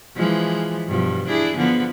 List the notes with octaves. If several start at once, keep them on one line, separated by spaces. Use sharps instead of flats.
E3 F3 G#3
G2 B2 F3
D4 E4 G#4
D3 F3 B3